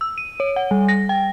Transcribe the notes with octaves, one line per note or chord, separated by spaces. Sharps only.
E6
D#7
C#5
F#5
G3
A#6
G5